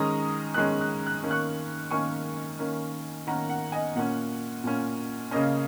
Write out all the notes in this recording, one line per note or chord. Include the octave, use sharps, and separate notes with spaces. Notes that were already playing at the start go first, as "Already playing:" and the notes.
Already playing: D#3 G#3 C#4 A#5 D#6
D#3 G#3 C#4 F#6
F#6
F#6
D#3 A#3 C#4
C#6 F#6
D#3 A#3 C#4 G#5 C#6
D#3 A#3 C#4
D#3 A#3 C#4 F#5 A#5
F#5
D#5 G#5
A#2 A#3 C#4 F#5
A#2 A#3 C#4
C#3 A#3 C#4 D#5